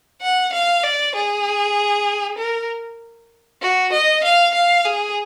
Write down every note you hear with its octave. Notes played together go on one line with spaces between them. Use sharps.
F#5
F5
D5
G#4
A#4
F#4
D#5
F5
F5
G#4